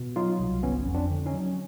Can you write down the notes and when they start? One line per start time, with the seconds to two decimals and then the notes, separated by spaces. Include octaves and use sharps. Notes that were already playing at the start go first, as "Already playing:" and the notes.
Already playing: B2
0.16 F#3 D#4 F4
0.40 C2
0.63 G1 B3 C#4
0.86 F2
0.95 C4 D4
1.10 D3
1.26 C#4 D#4
1.33 F#3